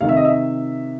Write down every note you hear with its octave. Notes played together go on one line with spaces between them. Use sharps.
C3 D#3 F5
E5
D#5
E5